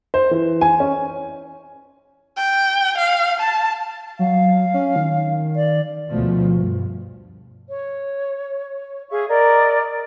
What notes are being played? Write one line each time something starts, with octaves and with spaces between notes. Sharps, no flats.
C5
E3
G#5
C#4
G5
F5
A5
F#3 F5
C#4
D#3
D5
D2 B2 F3 A3
G2
C#5
G#4 E5 F5 C#6
A#4 D5 D#5